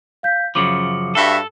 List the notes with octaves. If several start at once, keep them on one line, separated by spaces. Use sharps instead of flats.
F5 G6 B6
F#2 C#3 F3 D6 C#7
G2 F#4 A4 E5